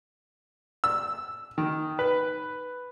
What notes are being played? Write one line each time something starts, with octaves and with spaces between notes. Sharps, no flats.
E6
D#3
B4